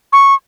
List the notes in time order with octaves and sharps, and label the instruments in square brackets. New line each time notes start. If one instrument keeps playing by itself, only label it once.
[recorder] C#6